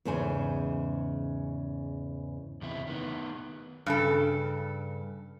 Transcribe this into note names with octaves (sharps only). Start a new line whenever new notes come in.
E2 G#2 C#3 C5 G#5
E2 C3 E4
D#3 B3
G2 C#3 A4